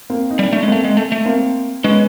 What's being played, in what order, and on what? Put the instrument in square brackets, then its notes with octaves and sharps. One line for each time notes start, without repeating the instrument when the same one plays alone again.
[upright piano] A#3 C4
D#4
[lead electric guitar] G3
[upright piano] D4
[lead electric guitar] A3 [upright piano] C#4
[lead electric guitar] G#3
[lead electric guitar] A3 [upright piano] A#3 C4
[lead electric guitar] G#3
A3
A3
[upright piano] A#3 C4
[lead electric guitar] G#3 [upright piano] B3 C#4